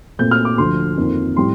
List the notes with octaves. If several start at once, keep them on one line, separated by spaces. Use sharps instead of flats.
A#2 A3 C4 G6
F6
D6
D2 D3 F3 C6
F2 D#3 A#3
A2 G3 C4 C6